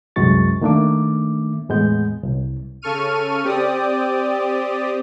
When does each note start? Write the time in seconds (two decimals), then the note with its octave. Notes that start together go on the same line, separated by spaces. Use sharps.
0.16 C2 F#2 C3 G#3 C#6 A6
0.61 D#3 A3 A#3 D4 E5 D6
1.69 E2 A2 G#3 B3 G6
2.23 C2
2.82 C#3 A4 C#6 F6 D#7
3.44 C4 G4 D5 D#6